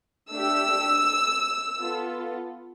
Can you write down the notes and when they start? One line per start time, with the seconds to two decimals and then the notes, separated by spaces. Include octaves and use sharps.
0.31 A3 D4 G4 E6
1.81 B3 F4 A4